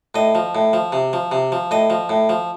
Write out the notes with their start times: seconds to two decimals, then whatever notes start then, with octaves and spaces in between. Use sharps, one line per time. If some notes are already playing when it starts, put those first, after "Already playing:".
0.15 A2 D#5
0.35 F3
0.55 A2
0.73 F3
0.92 C3
1.13 F3
1.32 C3
1.52 F3
1.71 A2 D#5
1.90 F3
2.09 A2
2.29 F3